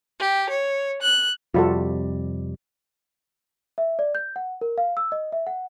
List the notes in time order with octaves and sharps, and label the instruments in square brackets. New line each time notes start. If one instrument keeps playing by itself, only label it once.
[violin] G4
C#5
F#6
[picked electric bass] F2 C3 G3 [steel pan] F4 F#4 A4
[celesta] E5
D5
G6
F#5
A#4
F5
E6
D#5
E5
F#5